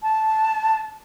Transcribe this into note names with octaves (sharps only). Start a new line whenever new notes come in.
A5